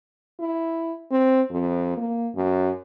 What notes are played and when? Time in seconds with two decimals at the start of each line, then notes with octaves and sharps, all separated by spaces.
0.40 E4
1.11 C4
1.50 F2
1.97 A#3
2.35 F#2